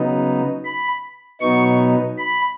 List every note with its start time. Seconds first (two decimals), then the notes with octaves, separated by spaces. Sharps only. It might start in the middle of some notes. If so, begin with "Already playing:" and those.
Already playing: C#3 F#3 B3 D#4
0.65 B5
1.41 B2 F#3 B3 D#4 C#6
2.18 B5